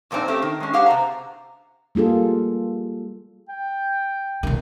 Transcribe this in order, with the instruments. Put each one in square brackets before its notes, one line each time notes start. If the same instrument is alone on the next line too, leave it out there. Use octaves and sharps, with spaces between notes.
[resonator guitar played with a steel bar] F2 A#2 A#3 C4 D#4
A3 C4 C#4 G4
D#3
G#3 C#4
G4 G#4 C5 F5 F#5
C3 C5 A#5
[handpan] G3 A#3 F4 G#4 A4
[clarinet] G5
[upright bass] B1 D#3